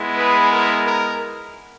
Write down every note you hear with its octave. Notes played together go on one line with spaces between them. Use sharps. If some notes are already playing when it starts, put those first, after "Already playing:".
Already playing: G#3 B3 E4
G#4 B4
A#4
A#4